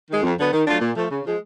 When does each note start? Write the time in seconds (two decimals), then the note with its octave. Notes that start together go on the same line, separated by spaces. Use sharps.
0.09 D#3 G#3
0.23 F2
0.37 D3 F#3 B3
0.52 D#3
0.66 F#3 A3 D4 F4
0.81 A#2
0.96 F3 A3
1.11 C#3
1.25 F3 G#3